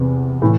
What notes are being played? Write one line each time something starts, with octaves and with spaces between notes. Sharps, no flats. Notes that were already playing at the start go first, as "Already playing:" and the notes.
Already playing: E2 C3 B3
A2 E3